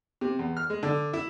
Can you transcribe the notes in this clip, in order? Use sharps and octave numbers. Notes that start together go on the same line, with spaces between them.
C3
E2
F6
G#3
D3
E4